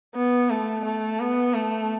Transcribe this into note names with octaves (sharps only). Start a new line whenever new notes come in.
B3
A3
A3
B3
A3